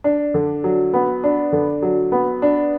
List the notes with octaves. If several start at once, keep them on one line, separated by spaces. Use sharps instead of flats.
D4
D3
F#3
B3
D4
D3
F#3
B3
D4